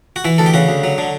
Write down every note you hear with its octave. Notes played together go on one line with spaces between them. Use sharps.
F#4
E3 E4
D2 A4
G4
C#3 F#4
D2
F#3
D3